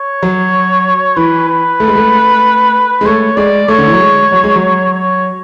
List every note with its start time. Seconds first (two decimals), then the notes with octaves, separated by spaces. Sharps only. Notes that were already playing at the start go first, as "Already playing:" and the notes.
Already playing: C#5
0.23 F#3
1.17 E3 B4
1.49 B4
1.80 A3
1.88 G#3
1.96 A3
3.01 G#3
3.06 A3 C#5
3.37 G#3 D5
3.68 A3 C#5
3.78 D3
3.87 E3
3.93 F#3
4.00 G#3
4.32 F#3
4.44 G#3
4.56 F#3
4.94 C#5